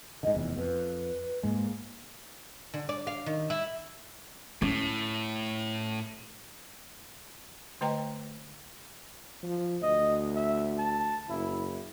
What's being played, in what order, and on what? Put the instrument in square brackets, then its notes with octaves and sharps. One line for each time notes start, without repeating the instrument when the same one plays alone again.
[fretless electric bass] G#2 D3 [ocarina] D#5
[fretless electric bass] F1 E2 [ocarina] B3
[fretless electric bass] F2 [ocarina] B4
[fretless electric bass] G#2 G#3 [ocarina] A#3
[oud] D3
D5
F5
D#3
E4
[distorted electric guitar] A2 [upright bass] C#4
[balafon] D3 A3 B4 D#5 G5 A#5
[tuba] F3
[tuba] D2 [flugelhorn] D#5
[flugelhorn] E5
A5
[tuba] F#1 [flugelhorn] E4